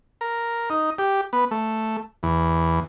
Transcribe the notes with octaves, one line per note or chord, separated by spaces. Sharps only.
A#4
D#4
G4
B3
A3
E2